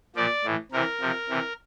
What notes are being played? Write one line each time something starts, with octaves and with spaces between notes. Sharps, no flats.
A#2 F3 D5
A2 E3
C3 E3 A#4
C3 F3
C3 E3